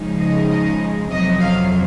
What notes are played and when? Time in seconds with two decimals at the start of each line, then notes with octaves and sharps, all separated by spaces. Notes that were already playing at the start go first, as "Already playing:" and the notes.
Already playing: C#3 F3 G#3 D#4
0.20 D#5
0.50 D#5
1.10 F2 C3 F#3 D#5
1.40 F5